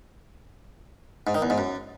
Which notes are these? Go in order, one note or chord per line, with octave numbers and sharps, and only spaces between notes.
G#2
D#3
E2
G#2
F#2